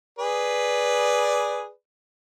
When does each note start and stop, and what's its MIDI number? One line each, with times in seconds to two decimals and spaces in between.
0.19 1.69 68
0.19 1.69 71
0.19 1.69 74